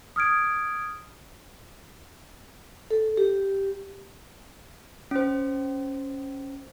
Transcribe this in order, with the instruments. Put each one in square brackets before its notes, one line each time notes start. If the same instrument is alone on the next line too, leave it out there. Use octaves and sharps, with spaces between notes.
[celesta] D#6 F6 G#6 D7
[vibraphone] A4
G4
[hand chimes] C#4 C5